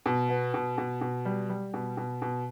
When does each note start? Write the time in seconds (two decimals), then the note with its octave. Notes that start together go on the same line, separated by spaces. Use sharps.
0.06 B2
0.29 B3
0.54 B2
0.78 B2
1.01 B2
1.25 G3
1.50 G3
1.74 B2
1.97 B2
2.22 B2